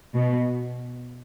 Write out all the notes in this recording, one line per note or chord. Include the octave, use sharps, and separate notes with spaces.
B2